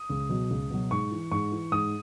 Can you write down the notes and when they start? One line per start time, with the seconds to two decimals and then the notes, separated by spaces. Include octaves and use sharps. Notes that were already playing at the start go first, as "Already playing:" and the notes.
Already playing: D#6
0.10 C#2
0.29 B2 F#3
0.50 C#2
0.70 B2 F#3
0.91 G#2 C#6
1.12 E3
1.31 G#2 C#6
1.52 E3
1.72 G#2 D#6